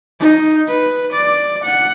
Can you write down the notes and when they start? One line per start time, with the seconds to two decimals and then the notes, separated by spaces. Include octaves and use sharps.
0.20 D#4
0.67 B4
1.12 D5
1.63 F#5